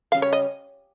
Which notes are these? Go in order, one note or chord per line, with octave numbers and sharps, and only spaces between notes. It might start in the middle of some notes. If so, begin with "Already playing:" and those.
C#3 G3 C#4 G#4 F5
C#5
D#5